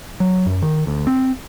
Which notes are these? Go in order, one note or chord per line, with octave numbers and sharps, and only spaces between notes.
F#3
F#2
D#3
D2
C4